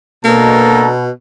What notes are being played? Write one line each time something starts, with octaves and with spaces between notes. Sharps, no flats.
B2 A#3 D4 A4 A#5